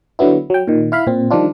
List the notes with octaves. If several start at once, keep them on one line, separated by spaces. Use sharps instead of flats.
D3 F#3 B3 E4
F#3 G5
A#2 D#3
E4 F5 B5
A#2 C4
D#3 F3 G3 D4 F4